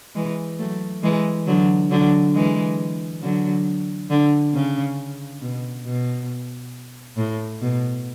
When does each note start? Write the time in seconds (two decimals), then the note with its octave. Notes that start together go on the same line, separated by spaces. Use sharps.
0.15 E3 G#3
0.59 F#3 A3
1.03 E3 G#3
1.47 D3 F#3
1.91 D3 F#3
2.34 E3 G#3
3.22 D3 F#3
4.10 D3
4.54 C#3
5.41 B2
5.85 B2
7.17 A2
7.61 B2